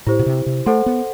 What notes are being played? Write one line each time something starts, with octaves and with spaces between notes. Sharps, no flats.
A2 E4 G4 C5
B2
C3
C3
A3 A4 C5 F#5 C6
B3